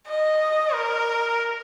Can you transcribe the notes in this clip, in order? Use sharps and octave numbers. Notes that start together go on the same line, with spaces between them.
D#5
A#4